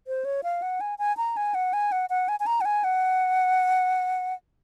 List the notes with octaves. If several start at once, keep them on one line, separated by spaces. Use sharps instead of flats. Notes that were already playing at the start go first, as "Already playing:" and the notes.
C5
C#5
F5
F#5
G#5
G#5
A#5
G#5
F#5
G#5
F#5
F#5
G#5
G#5
A#5
F#5
G#5
F#5